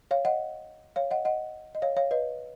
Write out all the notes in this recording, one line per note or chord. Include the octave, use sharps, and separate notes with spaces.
C#5 F5
D#5 F#5
C#5 F5
D#5 F#5
D#5 F#5
D#5
C#5 F5
C#5 F5
B4 D#5